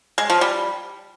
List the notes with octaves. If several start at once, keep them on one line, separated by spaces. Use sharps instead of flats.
G#3
F3
G3